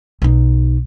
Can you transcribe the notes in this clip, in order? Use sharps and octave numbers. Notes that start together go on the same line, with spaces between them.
B1 D#4